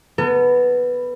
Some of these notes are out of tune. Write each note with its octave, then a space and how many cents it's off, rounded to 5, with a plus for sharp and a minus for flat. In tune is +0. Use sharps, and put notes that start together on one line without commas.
B3 +0 A4 +45